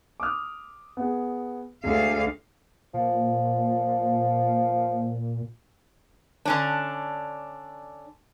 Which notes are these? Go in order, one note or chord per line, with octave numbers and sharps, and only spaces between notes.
D6 D#6 F6
B3 G#4
D2 G#3 F5
A#2 F3
D3 C#4 D4